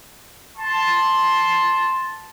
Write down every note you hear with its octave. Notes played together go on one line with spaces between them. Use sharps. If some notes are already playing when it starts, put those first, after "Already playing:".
A5 C6